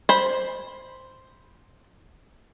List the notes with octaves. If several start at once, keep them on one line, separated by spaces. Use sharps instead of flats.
C5 B5